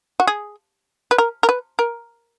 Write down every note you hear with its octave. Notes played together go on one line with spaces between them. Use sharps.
F#4
G#4
B4
A#4
A#4
B4
A#4